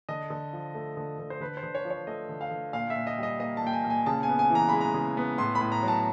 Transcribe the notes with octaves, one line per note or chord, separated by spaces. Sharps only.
D3 D#5
D3
F3
A3
D3
D3
C5
D3 B4
C5
D3
C#5
F3
C#5
A3 D#5
D3
F5
D3
A#2 F5
E5
A#2
D#5
G3 D#5
A#3 D#5
A5
A#2 G5
G#5
A#2
G#5
C#3 A5
G#5
B3
G#5
E3
A#5
G#3 B5
A#5
C#3
B3
A2 C6
B5
A2
A#5
F#3 A5